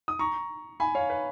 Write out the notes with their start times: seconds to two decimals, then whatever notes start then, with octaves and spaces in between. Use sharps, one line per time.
0.08 D#6
0.19 A#5 C#6
0.80 G#5 B5
0.95 C#5 F5
1.10 B4